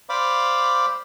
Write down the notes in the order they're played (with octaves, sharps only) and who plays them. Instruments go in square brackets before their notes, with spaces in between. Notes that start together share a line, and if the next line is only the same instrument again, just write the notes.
[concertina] C5 D5 F5 B5 D6